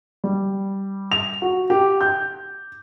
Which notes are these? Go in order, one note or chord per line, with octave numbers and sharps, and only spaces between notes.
G3
F7
F#4
G4
G6